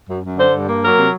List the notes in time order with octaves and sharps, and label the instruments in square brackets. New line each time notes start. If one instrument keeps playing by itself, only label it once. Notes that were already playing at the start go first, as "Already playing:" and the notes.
[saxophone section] F#2
F#2
D3 C5
G2
A#3
F#3 A#4
C3